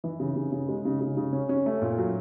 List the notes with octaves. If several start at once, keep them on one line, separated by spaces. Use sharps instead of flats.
E3
C#3
C#3
C#3
G#3
C#3
C#3
C#3
C#4
C#4
A3
A#2
F#3